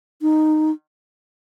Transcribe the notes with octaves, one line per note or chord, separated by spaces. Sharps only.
D#4